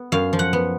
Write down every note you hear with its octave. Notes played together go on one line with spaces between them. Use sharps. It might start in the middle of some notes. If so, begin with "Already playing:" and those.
Already playing: B3
F#2 F5
F3
F#5
B3